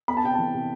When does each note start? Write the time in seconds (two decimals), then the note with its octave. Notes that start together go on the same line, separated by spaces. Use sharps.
0.08 B3 B5
0.17 A5
0.24 C3 G5
0.34 E3 A5
0.54 C3